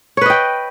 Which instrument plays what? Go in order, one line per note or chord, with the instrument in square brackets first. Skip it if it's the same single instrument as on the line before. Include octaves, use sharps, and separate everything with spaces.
[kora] C#5
B4
D#5
G5